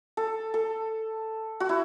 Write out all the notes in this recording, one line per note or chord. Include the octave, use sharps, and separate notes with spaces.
A4
A4
F#4
E4